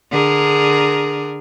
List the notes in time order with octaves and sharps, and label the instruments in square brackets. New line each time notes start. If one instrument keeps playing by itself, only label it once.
[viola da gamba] D3 G#4 A#4